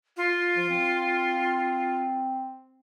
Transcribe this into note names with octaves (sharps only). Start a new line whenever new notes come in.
F4
F3
C4